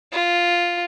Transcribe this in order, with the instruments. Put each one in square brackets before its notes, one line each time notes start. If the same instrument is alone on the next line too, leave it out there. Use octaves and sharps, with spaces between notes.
[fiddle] F4